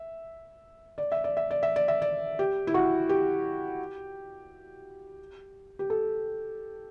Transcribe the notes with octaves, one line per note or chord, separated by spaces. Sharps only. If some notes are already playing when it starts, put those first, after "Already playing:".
Already playing: E5
D5
E5
D5
E5
D5
E5
D5
E5
D5
G4
E4
F#4
G4
G4
A4